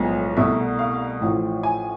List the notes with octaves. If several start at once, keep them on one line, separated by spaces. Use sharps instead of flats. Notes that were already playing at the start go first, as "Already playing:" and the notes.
Already playing: B1 A2 F3 G#3 B3
C2 B2 A3 E5
F5
A1 A2 F3
G#5